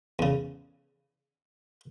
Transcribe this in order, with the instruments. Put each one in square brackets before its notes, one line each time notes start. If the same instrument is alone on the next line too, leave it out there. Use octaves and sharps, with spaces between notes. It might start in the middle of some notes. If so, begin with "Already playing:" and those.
[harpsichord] E2 C#3